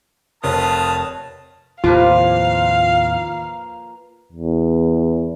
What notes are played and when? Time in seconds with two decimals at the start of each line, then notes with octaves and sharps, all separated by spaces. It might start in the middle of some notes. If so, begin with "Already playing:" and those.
0.44 F1 F4 A#4 B4 C#5 A5 D#6
1.84 D#2 A2 C3 F3 A#3 F4 B4 F5
4.32 E2